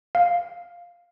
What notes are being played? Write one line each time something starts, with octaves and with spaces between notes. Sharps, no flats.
F5